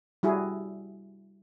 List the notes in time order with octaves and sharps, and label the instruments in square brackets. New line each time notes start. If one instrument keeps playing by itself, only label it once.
[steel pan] G3 E4 F#4 G#4